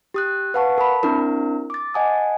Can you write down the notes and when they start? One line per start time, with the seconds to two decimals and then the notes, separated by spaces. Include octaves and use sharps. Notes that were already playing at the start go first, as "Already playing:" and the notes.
0.14 G4 D#6 F#6
0.54 B4 F5 F#5 A5 C#6
0.78 A#4 A5 B5
1.03 C4 D4 E4 A#4
1.70 D6 A6
1.94 D#5 F#5 G#5 A5 D#6